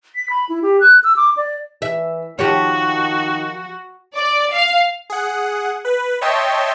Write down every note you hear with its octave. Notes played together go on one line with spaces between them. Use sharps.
B6
B5
E4
G4
F#6
E6
D6
D5
E3 E5
D#3 F3 F#4 G4 C#5
D5
F5
G#4 F#5
B4
C#5 D#5 E5 G5 A5 C6